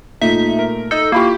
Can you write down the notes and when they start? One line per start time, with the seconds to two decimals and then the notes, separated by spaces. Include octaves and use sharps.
0.22 A#2 A3 D#4 E5
0.59 A#4
0.91 D#4 A4 D#5 G6
1.12 A#3 E4 F4 G4 B5 C#6